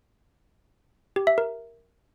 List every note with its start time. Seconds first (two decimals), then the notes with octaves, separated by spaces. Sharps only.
1.16 G4
1.27 E5
1.38 A#4